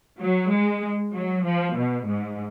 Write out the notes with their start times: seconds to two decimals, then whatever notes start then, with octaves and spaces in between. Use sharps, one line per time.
0.21 F#3
0.52 G#3
1.13 F#3
1.44 F3
1.75 B2
2.05 G#2